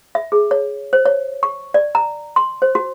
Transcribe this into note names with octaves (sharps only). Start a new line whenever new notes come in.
E5
G#4
C#5
C5
C#5
C#6
D5
A#5
C6
C5
F#4